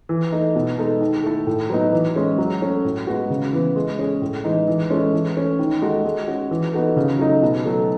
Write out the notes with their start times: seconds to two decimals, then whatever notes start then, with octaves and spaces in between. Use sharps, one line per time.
0.09 E3
0.32 A3 D#4
0.55 B2
0.78 G#3 D#4 A4
1.01 D#3
1.23 A3 E4 A4
1.47 A2
1.70 F#3 B3 D#4
1.93 E3
2.15 G#3 C#4 G#4
2.38 F#3
2.62 A3 C#4
2.85 A2
3.07 G#3 B3 F#4
3.30 C#3
3.53 E3 B3
3.76 G#3
3.99 C#4 G#4
4.22 A2
4.44 E3 G#3 D#4
4.67 E3
4.90 G#3 C#4 E4 A4
5.14 E3
5.36 A3 C#4
5.59 D#3
5.82 G#3 D#4 F#4 A4
6.05 G#3
6.28 C#4 F#4
6.51 E3
6.73 B3 D#4 F#4 A4
6.96 C#3
7.19 F#3 A3 D#4
7.42 B2
7.65 F#3 A3 D#4 A4